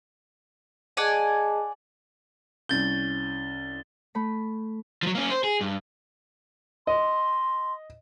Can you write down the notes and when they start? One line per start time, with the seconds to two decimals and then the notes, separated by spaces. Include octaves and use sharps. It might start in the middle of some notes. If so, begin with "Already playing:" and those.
0.97 G#4 D5 D#5 F#5 G#5 A5
2.69 C2 C#4 G6 A6 G7
4.15 A3 B5
5.03 F3 F#3
5.15 A#3 C#4
5.30 C5
5.44 G#4
5.61 G2
6.87 D#5 C6